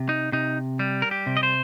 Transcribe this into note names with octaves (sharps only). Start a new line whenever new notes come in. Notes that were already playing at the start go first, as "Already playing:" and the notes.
Already playing: C3
D#4
C3 D#4
G3
A#4
G4
C3
D#5
C5